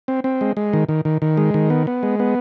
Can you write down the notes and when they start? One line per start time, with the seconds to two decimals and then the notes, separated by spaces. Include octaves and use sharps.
0.08 C4
0.24 C4
0.41 G#3
0.57 G#3
0.73 D#3
0.89 D#3
1.05 D#3
1.22 D#3
1.37 G#3
1.54 D#3
1.70 B3
1.87 B3
2.03 G#3
2.19 B3